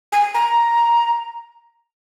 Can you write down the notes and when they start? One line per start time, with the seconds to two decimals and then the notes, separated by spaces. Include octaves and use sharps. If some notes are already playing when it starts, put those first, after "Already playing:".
0.12 G#5
0.34 A#5